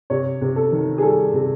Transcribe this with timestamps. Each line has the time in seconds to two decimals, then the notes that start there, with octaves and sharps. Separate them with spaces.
0.10 C3 C#5
0.41 C3
0.56 A4
0.72 D#3
0.98 G#4
1.02 G3 A4
1.34 C3